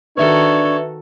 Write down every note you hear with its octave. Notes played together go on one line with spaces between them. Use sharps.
D#3 D4 F#4 A4 B4 C#5 E5